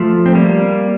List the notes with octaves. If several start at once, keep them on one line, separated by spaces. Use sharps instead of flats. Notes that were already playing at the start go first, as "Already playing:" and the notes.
Already playing: F3 A3
C4
G3 A#3